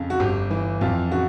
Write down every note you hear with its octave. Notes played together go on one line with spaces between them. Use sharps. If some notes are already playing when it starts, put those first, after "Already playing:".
Already playing: F2 C#3
F#4
G1 G4
E3
F2 F4
C#3 F#4